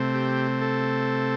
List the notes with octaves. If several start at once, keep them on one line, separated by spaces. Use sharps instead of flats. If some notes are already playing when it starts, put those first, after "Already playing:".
Already playing: C3 A3 C4
G4
A4